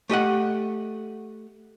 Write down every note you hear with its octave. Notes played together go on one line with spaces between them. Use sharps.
A3 G4 D#5 F#5